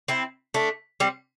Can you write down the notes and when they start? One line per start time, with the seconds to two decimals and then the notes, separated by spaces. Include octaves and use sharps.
0.08 C4 E4
0.54 A3 D4
1.00 G3 C4